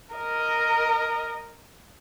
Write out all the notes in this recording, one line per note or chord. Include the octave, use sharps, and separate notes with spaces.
A#4 D#5